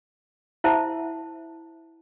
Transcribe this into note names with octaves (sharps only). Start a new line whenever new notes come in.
E4 C5 E5 F#5 A5